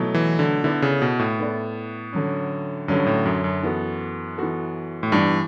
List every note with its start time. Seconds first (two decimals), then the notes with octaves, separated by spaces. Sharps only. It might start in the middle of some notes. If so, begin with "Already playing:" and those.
Already playing: B2 F#3 A3 E4
0.14 E3
0.39 D3
0.64 D3 B3 E4 A4 D5
0.82 C#3
1.02 B2
1.19 A2
1.39 B3 E4 A4 D5
2.13 D3 F#3 C#4
2.88 G2 D3 F#3 C#4
3.06 A2
3.25 F#2
3.44 F#2
3.63 E3 B3 F#4 A4
4.38 E3 B3 F#4 A4
5.03 A2
5.12 G2 E3 B3 D4